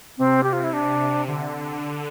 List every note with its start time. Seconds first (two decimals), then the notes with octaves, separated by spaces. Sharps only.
0.18 C3 C4
0.43 G4
0.53 F4
0.64 E4
0.73 C3 D4
1.28 D3